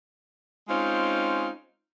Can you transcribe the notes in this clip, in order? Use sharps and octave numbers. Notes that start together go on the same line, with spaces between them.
G#3 C4 C#4 D#4 F4